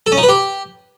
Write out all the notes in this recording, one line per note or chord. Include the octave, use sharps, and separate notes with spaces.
A4
C#4
D#4
B4
G4